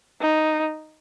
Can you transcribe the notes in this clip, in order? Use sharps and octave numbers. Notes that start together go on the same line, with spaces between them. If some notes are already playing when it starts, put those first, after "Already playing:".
D#4